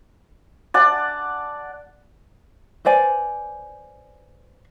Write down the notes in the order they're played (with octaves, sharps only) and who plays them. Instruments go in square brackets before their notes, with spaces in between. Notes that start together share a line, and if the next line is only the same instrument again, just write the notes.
[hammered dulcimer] D5 F#5 A5
[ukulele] B4 C5 D5 G#5